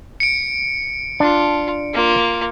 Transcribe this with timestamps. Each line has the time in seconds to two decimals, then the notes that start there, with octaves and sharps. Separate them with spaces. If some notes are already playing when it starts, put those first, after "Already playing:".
0.20 C#7 D7
1.20 D4 F4
1.94 A#3 F4